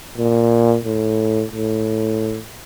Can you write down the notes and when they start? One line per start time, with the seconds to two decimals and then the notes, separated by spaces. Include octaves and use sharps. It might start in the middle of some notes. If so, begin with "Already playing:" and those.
0.18 A#2
0.85 A2
1.51 A2